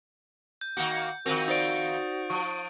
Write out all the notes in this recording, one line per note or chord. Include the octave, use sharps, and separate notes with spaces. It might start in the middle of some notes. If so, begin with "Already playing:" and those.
G6
D#3 A#3 F#4 F#5
D#3 F3 C4 F#4 A#4 A#6 D#7
D#4 C5 D5 D#6 A6 D7
F3 C#6